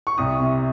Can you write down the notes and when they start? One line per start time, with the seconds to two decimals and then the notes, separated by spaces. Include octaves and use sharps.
0.07 C#6
0.18 C2 D#6
0.40 C3